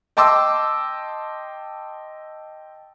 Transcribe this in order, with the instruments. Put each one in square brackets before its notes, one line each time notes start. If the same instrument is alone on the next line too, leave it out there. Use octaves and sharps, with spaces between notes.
[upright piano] D#5 G5 A5 C6 D6 E6